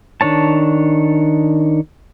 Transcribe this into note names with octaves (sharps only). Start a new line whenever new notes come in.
D#3 D4 C#5 A5